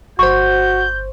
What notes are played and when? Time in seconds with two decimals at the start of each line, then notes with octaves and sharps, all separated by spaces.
0.19 G1 F#4 C5 C#6 G6